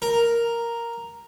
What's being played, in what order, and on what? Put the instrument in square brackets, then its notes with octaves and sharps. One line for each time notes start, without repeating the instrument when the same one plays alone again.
[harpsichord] A#4